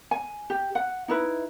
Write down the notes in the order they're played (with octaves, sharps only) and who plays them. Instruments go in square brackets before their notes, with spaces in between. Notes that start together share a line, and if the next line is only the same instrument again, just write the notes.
[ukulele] G#5
G4
F#5
D#4 E4 B4